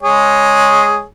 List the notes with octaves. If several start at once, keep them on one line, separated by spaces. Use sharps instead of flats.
G#3 G#4 C#5